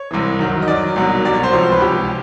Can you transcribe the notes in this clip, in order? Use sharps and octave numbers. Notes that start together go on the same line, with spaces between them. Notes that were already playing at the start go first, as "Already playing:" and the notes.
Already playing: C#5
C2 C3 E3
F#2 D#3 F#3
D#5
F#2 D#3 F#3 D5
C2 B2 F#3
C2 B2 F#3 D5
C#5
C5
C#2 C3 F3 C#5
C5
B4
C#2 C3 F3 G4